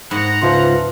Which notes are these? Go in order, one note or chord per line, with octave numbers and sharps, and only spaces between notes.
G#2 F#5 A#5 B5 A#6 C#7
C#2 F3 B4 E5 C6